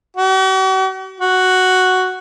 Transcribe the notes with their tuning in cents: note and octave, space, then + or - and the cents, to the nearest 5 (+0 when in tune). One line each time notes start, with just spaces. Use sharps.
F#4 +45
F#4 +0